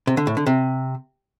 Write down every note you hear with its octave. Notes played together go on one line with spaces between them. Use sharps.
C3
D3
A2
D3
C3